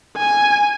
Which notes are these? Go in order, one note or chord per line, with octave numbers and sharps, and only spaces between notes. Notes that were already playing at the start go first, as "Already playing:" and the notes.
G#5